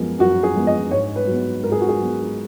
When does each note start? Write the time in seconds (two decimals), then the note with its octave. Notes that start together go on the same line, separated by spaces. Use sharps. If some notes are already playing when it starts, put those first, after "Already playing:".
Already playing: F#2 F3 G#3 B3 A#4
0.19 F#2 F#4
0.43 G#4
0.55 F3 G#3 B3
0.67 D#5
0.91 G#2 C#5
1.15 B4
1.27 F#3 B3
1.63 G#2 A#4
1.72 G#4
1.81 F#4
1.89 G#4
1.99 F#3 B3